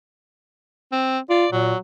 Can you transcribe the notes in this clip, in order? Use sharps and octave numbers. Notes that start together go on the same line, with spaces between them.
C4
F4 D5
A#2 F#3